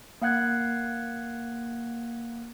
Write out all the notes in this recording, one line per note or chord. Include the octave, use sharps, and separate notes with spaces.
A#3 F5 F#5 F#6 G#6